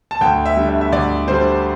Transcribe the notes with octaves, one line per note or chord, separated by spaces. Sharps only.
A5
D2 G5
E5
D3 G3
E5
E5
D2 D5
D3 G3 C5